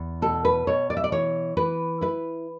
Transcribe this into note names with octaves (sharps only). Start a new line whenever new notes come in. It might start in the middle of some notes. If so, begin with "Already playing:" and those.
Already playing: E2
B2 A4
B4
B2 C#5
D5
E5
D5
E3 C#5
E3 B4
E4 B4